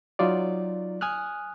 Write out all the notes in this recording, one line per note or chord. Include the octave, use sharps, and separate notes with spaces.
F#3 D#4 F4 D5
G#5 D#6 F6 F#6